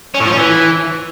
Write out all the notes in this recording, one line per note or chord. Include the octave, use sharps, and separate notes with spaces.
C#4
A2
F3
C#4
E3